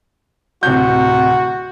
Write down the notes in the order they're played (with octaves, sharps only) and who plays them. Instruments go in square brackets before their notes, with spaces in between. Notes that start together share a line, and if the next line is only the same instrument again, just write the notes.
[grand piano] D1 C3 G6 [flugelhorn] F#4